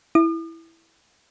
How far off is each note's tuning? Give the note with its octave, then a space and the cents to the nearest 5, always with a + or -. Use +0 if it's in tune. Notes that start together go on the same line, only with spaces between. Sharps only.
E4 +0 D#6 -45